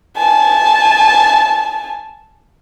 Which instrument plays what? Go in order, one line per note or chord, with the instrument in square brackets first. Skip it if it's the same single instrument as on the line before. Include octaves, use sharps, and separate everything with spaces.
[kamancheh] G#5 A5